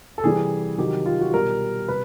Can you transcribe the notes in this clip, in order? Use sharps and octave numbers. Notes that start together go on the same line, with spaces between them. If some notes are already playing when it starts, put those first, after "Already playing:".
A4
C3 E3 G3 G#4
C3 D#3 F#3 G4
F4
F#4
B2 G3 A#4
C3 G3 B4